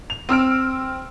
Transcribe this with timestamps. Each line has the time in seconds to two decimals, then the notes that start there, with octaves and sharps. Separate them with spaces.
0.10 F7
0.29 C4 E6 F6 D7